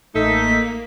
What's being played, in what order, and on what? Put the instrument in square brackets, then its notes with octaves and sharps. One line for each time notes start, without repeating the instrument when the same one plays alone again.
[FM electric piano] A1 A4 E6 [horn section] A3 D#4 [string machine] A#3 [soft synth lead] B6